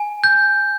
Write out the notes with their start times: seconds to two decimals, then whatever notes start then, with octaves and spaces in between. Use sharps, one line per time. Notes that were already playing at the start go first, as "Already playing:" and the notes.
Already playing: G#5
0.24 G6